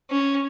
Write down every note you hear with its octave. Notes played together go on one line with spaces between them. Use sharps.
C#4